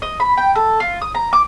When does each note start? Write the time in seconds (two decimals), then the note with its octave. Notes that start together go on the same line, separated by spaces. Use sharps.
0.02 D#5
0.20 B5
0.37 G5
0.56 A4
0.80 F4
1.01 D#6
1.15 A#5
1.33 D6